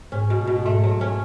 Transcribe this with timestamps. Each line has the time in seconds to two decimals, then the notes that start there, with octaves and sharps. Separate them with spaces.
0.12 G#2 C#4
0.30 B2
0.47 B2
0.65 G#2 A3
0.84 F#3
1.01 C#4